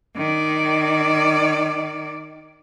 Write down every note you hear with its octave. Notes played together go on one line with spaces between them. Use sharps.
D#3 D5